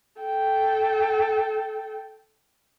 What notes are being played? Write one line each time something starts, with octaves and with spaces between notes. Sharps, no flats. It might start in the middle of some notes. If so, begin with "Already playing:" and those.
A4 G5